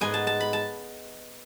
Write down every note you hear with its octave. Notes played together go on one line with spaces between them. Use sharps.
G#2 G#3 B3 G#5
A5
A5
B5
A5